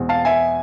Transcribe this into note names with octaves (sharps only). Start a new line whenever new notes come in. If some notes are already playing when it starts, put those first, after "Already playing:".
Already playing: E2 B2 G#3 C4
F5 A5
E5 G#5